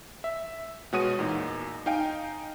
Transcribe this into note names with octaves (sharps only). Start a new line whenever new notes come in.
E5
B2 G#3 F#4 C#5 D#6 D#7
E2 A#2 D#4
D#4 F5 G5 G#5